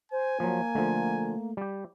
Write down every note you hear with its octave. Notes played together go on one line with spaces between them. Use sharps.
C5 G#5
F3 F#3 A#3
D3 F3 A3
G3 G4